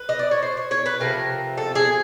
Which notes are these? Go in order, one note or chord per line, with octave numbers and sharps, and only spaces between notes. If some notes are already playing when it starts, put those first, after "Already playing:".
Already playing: B4
D#5
D5
C#5
C5
C#5
C#5
B4
C3 F3 A3 A#4
A4
G#4